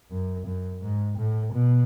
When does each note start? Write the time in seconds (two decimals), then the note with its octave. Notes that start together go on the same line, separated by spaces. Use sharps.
0.11 F#2
0.46 F#2
0.81 G#2
1.17 A2
1.53 B2